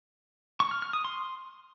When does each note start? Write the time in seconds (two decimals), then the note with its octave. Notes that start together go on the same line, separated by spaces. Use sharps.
0.60 C#6
0.71 F6
0.82 F6
0.93 D#6
1.05 C6